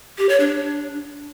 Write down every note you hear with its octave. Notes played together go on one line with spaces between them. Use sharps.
G4
C#5
D4